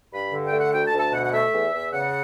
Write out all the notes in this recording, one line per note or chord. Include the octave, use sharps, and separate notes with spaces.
G2 B5
D3
G5
A3
F#5
D2 G5
A5
D2
A5
B2 F#5
F#5
A3 E5
E2
E2
C#3 F#5